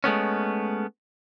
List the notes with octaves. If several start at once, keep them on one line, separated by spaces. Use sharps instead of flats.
G#3 A3 B3 C#4